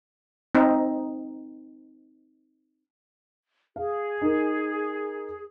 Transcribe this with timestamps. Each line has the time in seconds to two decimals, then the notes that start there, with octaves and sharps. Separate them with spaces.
0.55 C4 D#4
3.76 G#4 F5
4.21 D#4 A#4